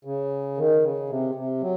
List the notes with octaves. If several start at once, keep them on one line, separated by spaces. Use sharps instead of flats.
C#3
D#3
C#3
C3
C3
F#3